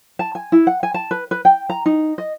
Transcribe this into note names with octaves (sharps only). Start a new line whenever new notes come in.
A5
G#5
E4
F#5
G#5
A5
B4
B4
G5
A#5
D#4
D#5